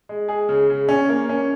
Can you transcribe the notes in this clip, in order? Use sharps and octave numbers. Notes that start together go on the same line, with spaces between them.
G#3
G#4
C#3
C#3
C#4
A#3
C#4